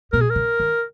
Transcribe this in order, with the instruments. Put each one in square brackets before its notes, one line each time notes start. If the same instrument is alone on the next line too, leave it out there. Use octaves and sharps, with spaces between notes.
[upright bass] B2 [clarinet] A#4
[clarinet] G#4
A#4
[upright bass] C#3
D#3